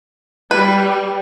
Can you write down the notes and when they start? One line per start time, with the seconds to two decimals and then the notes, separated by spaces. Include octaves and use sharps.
0.51 G3 B4